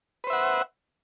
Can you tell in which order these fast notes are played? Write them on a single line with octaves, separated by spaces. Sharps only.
B4 C5 E5 F#5